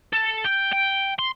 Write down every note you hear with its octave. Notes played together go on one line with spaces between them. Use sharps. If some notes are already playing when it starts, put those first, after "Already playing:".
A4
G5
G5
C6